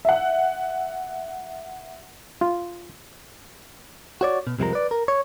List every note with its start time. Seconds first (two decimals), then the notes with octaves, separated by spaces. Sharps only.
0.05 E5 F#5
2.41 F4
4.21 F#4 C#5 D5
4.47 B2
4.59 C2 F2 C3 F3 G#3 A#4
4.73 B4 D5
4.91 A#4
5.08 C#5